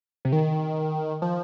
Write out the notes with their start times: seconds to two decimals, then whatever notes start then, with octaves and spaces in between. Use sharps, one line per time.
0.25 C3
0.32 D#3
1.22 F3